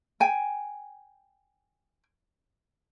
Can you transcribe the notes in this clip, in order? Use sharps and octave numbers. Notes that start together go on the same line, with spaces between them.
G5 G#5